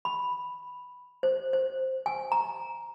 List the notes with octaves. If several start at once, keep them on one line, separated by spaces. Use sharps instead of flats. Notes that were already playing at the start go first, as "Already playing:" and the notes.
B5
C5
C5
G#5
A#5